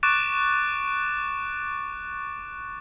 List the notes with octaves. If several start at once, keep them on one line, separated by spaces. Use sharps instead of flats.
C#6 D6 F#6 A6 D7 E7